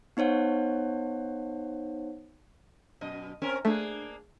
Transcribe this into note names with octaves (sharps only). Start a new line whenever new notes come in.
B3 D#4 C5 C#5 F#5
F#2 B2 D#5
C4 C#4 A#4
A3 A#3 D4 G#4